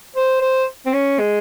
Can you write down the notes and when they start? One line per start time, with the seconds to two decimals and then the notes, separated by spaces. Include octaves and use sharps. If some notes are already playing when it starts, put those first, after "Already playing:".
0.16 C5
0.41 C5
0.86 C4
0.93 C#4
1.19 G#3